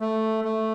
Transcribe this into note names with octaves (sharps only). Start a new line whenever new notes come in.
A3
A3